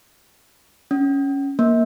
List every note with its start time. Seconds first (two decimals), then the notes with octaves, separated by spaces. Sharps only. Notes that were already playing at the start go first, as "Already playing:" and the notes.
0.91 C#4
1.59 A#3